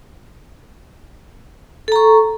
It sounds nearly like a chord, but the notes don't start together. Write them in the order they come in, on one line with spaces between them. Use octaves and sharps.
A4 A#5 C#6